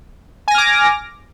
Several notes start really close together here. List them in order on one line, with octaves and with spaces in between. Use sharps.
G#5 A#6 F6 D6